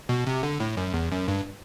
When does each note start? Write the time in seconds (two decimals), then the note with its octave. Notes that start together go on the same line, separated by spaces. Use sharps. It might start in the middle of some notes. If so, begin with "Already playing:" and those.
0.09 B2
0.27 C3
0.43 D3
0.60 A2
0.77 F#2
0.94 E2
1.12 F#2
1.28 G2